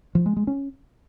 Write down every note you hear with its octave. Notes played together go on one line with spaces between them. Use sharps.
F3
G#3
G#3
C#4